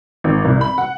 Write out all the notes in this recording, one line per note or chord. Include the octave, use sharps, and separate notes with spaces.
G#1
C2
B5
F#5